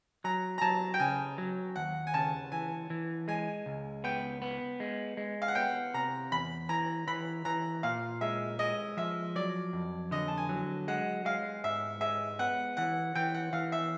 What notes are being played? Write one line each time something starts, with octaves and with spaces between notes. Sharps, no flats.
F#3 A#5
A#5
F#3 A5
G5
C#3 G#5
F#3
D#2 F#5
G#5
C#3 A5
E3 G#5
E3
G#3 G#5
C#2
B3 G5
B3
G#3
G#3
F5
F#5
B3 G5
C3 A#5
E2 B5
E3 A#5
E3 B5
E3 A#5
A#2 F5
G#3 E5
G#3 D#5
F3 E5
F#3 D5
F2
D3 D#5
A5
G#5
F#3
G#3 F#5
G#3 F5
G#2 E5
G#3 E5
B3 F#5
E3 F#5
E3 G5
F#5
E3 F5
E5